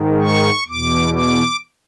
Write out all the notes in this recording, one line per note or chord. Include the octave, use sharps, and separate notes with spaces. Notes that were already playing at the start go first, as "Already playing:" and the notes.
Already playing: G#2 D#3
C#6
E2 B2 D6
D6